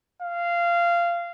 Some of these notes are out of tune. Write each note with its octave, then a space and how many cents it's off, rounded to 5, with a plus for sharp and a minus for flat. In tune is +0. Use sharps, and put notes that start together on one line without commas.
F5 -15